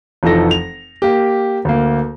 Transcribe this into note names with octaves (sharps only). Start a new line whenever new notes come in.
F1 E3 F3 D#4 A4 A#6
F7
A#3 G4
D2 A#3